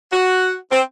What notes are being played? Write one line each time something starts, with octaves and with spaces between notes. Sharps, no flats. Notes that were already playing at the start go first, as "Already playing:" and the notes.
F#4
C4